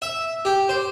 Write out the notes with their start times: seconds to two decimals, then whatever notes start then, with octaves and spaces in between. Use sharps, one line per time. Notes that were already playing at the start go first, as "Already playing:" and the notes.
0.02 E5
0.45 G4
0.69 C5